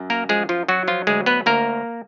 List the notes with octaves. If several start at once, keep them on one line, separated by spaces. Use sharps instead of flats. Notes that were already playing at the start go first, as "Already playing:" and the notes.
Already playing: F#2
A#3 A#4
F3 G#3 G#4
F3 F4
F#3 F#4
F3 F4
D2 G#3 G#4
B3 B4
D2 A#3 A#4